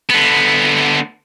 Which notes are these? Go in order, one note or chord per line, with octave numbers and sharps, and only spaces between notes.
D3 B3